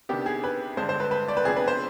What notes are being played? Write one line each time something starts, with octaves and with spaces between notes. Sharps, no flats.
C3 D#3 B3 D4 G4
G#4
B4
G2 D3 G#3 D4 C5
C5
B4
B4
D5
B4
C3 F3 B3 D4 G#4
B4
C5